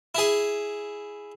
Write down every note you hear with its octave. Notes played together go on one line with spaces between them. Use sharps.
E4 G#4